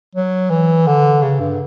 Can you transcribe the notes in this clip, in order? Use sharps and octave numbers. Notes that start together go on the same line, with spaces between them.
F#3
E3
D3
C#3
G2